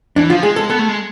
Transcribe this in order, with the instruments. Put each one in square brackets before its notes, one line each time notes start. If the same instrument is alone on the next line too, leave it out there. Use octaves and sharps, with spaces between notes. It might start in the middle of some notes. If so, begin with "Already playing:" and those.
[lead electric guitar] E3 [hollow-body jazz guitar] D4
[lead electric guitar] F3 [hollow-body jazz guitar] F4
[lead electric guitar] G#3 [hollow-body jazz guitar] G#4
[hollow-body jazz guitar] A4
[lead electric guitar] B3 [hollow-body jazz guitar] A4
[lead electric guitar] A3
G#3